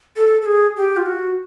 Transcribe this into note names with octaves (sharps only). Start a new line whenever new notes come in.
A4
A4
G#4
G4
F4
F#4